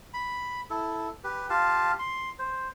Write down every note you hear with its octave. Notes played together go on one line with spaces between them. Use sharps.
B5
E4 A4
G4 B4
F4 G4 F5 A5
C6
C5